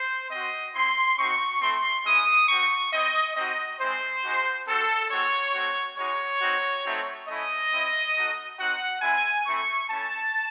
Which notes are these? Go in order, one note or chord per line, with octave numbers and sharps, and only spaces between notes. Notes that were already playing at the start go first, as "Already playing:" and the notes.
Already playing: C5
C4 F#4 D#5
C4 E4 C6
C4 D#4 F#4 C#6
A3 C4 E4 C6
G#3 C#4 E4 D#6
C4 F#4 C#6
C4 E4 D#5
C4 D#4 F#4 D#5
G#3 C4 E4 C5
G#3 D#4 F#4
C4 F#4 A4
G#3 C4 F#4 C#5
A3 C4 F#4
G#3 D#4 F#4 C#5
C4 D#4 F#4
A3 C4 D#4 F#4
A3 C#4 E4 D#5
C4 E4
A3 D#4 F#4
C4 D#4 F#4 F#5
G#3 C4 E4 G#5
A3 C4 E4 C#6
A3 C#4 E4 A5